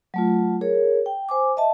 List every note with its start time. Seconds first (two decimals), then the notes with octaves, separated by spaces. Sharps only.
0.14 F#3 A3 F4
0.61 G#4 A#4 C#5
1.06 G5
1.29 C5 G#5 D6
1.57 D#5 E5 A5